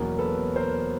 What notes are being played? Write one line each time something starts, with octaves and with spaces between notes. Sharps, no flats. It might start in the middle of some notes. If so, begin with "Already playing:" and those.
Already playing: E2 B2 F#3 A#3 C#4 A#4
A4 B4
A#4 C5